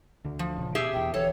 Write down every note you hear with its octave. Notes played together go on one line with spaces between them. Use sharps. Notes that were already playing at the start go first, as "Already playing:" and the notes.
D2 D3
F3
D#1 A#2 C#3
B2 G4 G#4 E5
E2 B2 G5
D1 E3 A4 C#5